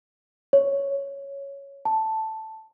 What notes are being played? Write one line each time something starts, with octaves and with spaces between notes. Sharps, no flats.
C#5
A5